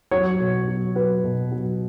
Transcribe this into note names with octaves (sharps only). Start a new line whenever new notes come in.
F#3 C#5
B2
F#3
F#3 B4
B2
F#3